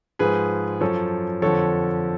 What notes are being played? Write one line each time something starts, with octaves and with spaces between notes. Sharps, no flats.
G#2 F3 G#4 B4
F#2 F3 A4 C#5
F2 D3 F3 A4 C#5